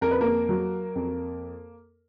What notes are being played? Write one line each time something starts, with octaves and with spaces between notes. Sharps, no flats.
F2 A#4
B4
A#3 A#4
F#3
F2